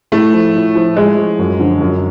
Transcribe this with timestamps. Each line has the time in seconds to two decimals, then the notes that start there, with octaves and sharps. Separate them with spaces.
0.12 A2 A3
0.33 F3
0.54 A2
0.75 F3
0.96 A2 G#3
1.17 F3
1.39 F#2
1.59 D3 F3
1.80 F#2